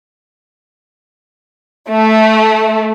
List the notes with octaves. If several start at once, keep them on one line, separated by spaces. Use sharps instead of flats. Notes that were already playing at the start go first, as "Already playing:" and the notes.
A3